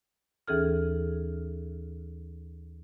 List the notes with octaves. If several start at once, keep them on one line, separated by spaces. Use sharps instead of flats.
D#2 E3 C#4 G#4 A4 F6